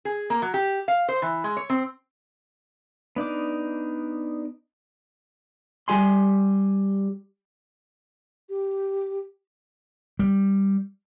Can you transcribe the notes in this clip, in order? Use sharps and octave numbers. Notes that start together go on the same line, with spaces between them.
G#4
A#3
F#3
G4
F5
C5
E3
G#3
C#5
C4
B3 D4 D#4 D6
G3 G4 G#5 C6
G4
G3